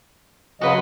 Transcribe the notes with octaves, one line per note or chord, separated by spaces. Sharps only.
C#3 F#3 F#4 B4 D#5 C6